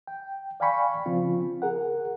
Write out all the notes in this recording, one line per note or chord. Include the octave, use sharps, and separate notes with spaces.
G5
D5 F5 G5 G#5 B5 C#6
C#3 F3 C4 F4
G#4 A#4 F#5